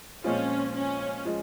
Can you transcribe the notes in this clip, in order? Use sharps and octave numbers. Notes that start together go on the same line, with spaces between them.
A#2 F3 G#3 C4 C#4 F4
C#4
F3 G#3